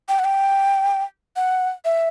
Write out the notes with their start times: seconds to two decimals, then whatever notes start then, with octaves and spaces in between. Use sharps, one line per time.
0.08 G5
0.19 F#5
0.24 G5
1.36 F#5
1.85 E5